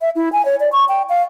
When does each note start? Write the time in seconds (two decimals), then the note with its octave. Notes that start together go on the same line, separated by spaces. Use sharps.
0.01 E5
0.15 E4
0.32 G#5
0.45 C#5
0.60 D5
0.72 C#6
0.89 G5
1.09 F5